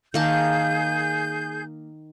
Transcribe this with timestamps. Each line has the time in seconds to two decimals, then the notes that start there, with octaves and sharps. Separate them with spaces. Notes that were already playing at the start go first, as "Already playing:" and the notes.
0.14 D#3 A#3 G#4 A5 G6